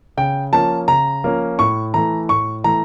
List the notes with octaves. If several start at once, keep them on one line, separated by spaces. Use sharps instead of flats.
C#3 G5
F3 A#3 C#4 A5
C#3 A#5
F3 A#3 C#4
A2 C#6
E3 A3 A#5
A2 C#6
E3 A3 A#5